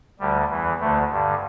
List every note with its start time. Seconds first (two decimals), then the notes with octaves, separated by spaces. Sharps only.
0.20 D2 D3 G3
0.50 E2 E3
0.80 D2 D3 A3
1.11 G2 D3